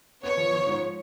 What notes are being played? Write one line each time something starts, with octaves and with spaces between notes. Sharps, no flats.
B3 C#5
F3
F3
G#2